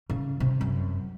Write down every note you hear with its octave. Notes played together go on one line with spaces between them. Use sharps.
C#3
C3
F#2